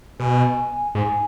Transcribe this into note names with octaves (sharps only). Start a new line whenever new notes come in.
B2 G#5
G#2 G#5